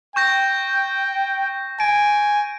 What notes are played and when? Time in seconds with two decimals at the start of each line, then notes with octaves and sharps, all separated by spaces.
0.16 G5 C#6 G6 A#6
1.80 G#5 D7